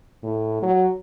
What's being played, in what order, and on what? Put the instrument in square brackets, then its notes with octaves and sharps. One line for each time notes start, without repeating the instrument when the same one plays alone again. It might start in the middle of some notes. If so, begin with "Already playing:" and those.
[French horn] A2
F#3